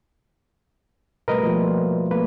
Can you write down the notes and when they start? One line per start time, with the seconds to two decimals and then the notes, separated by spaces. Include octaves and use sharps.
1.28 B2 G3 A3 A#4 B4 D#5
1.43 F3 A#3 F4
2.11 A3 A#3 B4